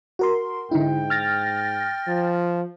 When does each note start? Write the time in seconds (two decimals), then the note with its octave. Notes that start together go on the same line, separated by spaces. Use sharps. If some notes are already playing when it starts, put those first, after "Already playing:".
0.19 F#4 A#4 C6
0.72 G#2 D3 D#4 E4 G5
1.10 F6 A6 A#6
2.08 F3